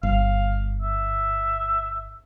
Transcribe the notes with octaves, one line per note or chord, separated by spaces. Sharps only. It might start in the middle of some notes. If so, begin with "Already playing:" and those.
G1 F5
E5